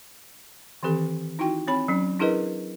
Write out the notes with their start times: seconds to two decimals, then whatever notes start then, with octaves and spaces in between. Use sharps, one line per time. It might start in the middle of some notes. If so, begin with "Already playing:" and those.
0.83 D#3 E3 C4 G4 A4
1.39 D#4 E4 F#4 G5
1.68 C4 C#5 B5
1.88 F#3 C#4
2.19 D4 E4 G#4 A#4 B4 D#5